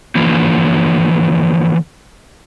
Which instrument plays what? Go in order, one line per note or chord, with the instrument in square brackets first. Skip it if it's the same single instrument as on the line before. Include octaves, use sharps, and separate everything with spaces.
[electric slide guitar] D3 E3 F3 A#3